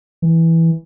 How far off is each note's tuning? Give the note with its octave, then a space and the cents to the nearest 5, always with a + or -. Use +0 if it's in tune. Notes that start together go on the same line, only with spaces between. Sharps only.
E3 -5